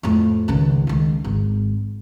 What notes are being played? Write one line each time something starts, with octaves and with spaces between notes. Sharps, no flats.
F2 A2
C#2 D#3
C#2 D#3
G#1